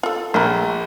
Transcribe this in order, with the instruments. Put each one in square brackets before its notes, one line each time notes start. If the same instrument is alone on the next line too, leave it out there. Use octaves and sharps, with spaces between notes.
[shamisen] F4 A4
[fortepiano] A#1 [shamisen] A4 A#4